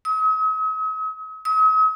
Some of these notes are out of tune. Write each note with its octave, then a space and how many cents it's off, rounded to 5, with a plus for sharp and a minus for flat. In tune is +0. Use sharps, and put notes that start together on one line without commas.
D#6 +45
D#6 +45